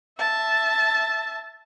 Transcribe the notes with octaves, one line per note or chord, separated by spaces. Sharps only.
E5 A5